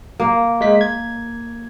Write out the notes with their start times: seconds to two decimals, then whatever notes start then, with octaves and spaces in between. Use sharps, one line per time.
0.20 A#3
0.61 G#3 B6
0.81 G#6